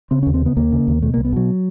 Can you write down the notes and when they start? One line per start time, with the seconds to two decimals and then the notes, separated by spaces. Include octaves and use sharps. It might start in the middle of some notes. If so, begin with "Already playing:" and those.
0.11 C#3 C4
0.23 D#2 C#4
0.34 C4
0.42 C#3 B3
0.57 D#2 A#3
0.72 C#3
0.87 D#2
1.02 B2 A3
1.14 C2 A#3
1.25 B3
1.33 B2 F#3